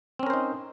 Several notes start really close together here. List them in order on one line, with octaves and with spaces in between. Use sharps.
C4 C#4 A#4 C5 D#4